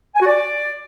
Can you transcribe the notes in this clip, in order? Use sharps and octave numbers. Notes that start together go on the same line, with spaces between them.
G#5
F#4
D5